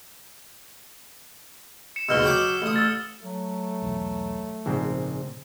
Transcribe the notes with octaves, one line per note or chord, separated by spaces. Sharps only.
C#7 E7
D#2 G#2 B2 E6 F6 G7
F#3 G5 D6
A1 D#6
E6 A6
F#3 A3
B1 E2
A#1 G#2 C#3 C4